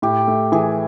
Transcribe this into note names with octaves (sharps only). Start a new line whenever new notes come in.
A2 G4
A3
E3 G#4